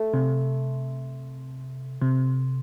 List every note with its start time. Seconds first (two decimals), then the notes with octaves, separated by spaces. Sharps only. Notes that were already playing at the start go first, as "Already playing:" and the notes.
Already playing: A3
0.14 C3
2.02 C3